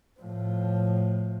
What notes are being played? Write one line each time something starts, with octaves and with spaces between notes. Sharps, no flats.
A2 F3